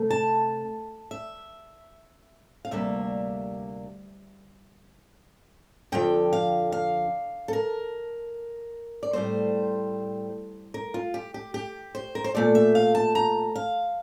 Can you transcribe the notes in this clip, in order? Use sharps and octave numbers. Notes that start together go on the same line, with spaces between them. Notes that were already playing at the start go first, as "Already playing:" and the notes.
Already playing: C3 A3
A5
E5
F5
D2 C3 G3 A#3 D4 E5
F2 D3 F3 G5
F5
F5
A4
A#4
D5
A2 G3 C4 C5
A#4
F4
G4
G4
G4
C5
A#4
C5
A#2 A3 C4 D5
E5
F5
A5
A#5
F5